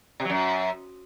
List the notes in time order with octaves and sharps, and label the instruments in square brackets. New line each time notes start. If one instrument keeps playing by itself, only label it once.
[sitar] C3
F#3
F#2